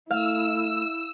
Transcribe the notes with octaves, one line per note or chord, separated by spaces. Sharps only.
A3 E4 F5 E6